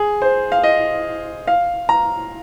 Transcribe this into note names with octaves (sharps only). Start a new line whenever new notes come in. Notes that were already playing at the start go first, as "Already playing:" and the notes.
Already playing: G#4
C5
F5
D#5
F5
A#5